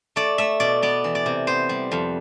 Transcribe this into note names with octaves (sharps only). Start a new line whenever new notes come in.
A3 D5
A3 E5
B2 D5
B3 D5
E3
D5
C3
B3 C5
G3
F2